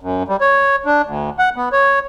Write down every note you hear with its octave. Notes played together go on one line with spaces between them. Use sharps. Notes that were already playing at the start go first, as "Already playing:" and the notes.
F#2
G3
C#5
D4
D2
F#5
B3
C#5